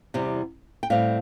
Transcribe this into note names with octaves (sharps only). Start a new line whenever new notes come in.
E2 C3 G3 C4
G5
A2 G3 C4 F5